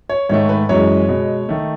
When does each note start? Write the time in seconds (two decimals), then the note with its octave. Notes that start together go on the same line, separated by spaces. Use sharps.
0.10 C#5
0.29 G#2 D#3 A3 C#5
0.49 B4
0.69 F#2 E3 G#3 C#5
1.09 B2 G#3
1.49 D#3 A3